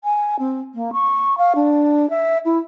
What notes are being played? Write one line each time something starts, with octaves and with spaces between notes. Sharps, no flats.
G#5
C4
A#3
C#6
F5
D4
E5
E4